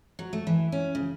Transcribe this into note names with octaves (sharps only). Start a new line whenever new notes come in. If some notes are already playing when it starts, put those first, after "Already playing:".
F#3
A3
E3
C#4
C#3